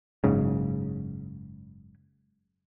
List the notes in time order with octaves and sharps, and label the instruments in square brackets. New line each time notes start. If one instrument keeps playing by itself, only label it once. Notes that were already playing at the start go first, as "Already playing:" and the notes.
[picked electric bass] F#1 G#2 C#3